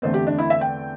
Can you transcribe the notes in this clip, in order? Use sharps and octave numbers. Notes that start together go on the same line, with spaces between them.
E2 D3 A3 C4 C5
G4
D4
E4
E5
G5